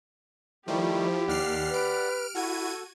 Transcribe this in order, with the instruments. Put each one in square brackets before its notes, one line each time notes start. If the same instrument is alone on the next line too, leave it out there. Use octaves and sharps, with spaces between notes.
[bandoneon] D#3 G3 A3 [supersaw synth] F3 [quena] E4 [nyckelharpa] G4
[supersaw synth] D#2 F6 C7 [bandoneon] D5 F#5
[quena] B4 [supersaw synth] F6 D7
[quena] E4 [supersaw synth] F#4 G#6 D#7 [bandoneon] A4